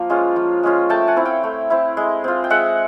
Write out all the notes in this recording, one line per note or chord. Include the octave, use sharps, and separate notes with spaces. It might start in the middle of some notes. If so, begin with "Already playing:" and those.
Already playing: F3 A#3
G#3 C#4 F4
F3
G#3 C#4 F4
A3 G5 A5
F#5 G#5
C4 E4
F5 G5
A3
C4 E4
G#3
C4 F4
G5
G#3 E5 F#5